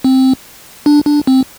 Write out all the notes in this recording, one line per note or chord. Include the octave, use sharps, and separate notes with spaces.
C4
D4
D4
C4